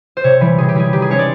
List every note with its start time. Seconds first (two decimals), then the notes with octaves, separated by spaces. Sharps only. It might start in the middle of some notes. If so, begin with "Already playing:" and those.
0.17 C5
0.24 C3 C#5
0.41 E3 G3
0.58 C3 G#4
0.69 G4
0.75 E3 G3 G#4
0.93 D#3 G4
1.02 G#4
1.10 G#3 C#4 C#5
1.19 D5